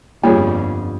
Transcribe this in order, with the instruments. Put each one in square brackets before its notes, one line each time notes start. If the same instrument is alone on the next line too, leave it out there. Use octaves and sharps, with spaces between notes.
[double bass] G1 F2 [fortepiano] G3 C#4 G#4 [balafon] A#3 F4